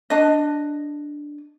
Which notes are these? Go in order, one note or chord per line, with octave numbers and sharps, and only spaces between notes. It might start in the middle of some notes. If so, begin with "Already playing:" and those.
D4 D#5